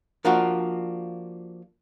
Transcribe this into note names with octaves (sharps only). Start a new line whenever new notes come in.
F3 A#3 D4 F4 F#4